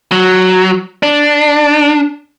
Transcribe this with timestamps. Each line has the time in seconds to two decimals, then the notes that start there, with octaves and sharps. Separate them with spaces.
0.12 F#3
1.03 D4